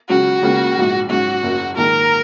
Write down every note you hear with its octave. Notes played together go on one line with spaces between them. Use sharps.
C#2 C#3 F#3 C#4 F#4
C#2 C#3 A#3
A#1 G#2 F#3
G#2 F#3 C#4 F#4
F#1 F#2 F#3 C#4
A#1 G#2 D#3 A#3 A#4